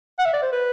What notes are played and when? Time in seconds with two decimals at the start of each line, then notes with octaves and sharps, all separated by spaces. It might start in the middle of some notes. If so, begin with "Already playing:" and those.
0.19 F#5
0.25 E5
0.34 D5
0.42 C5
0.52 B4